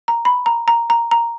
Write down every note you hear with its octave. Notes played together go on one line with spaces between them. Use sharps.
A#5
B5
A#5
A#5
A#5
A#5